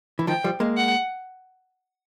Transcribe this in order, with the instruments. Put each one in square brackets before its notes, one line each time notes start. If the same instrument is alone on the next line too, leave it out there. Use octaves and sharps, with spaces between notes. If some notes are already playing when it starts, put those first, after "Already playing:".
[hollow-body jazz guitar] E3
[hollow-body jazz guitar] D#3 F3 [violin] G5
[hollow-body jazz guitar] F3 G3
G#3 A#3
[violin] F#5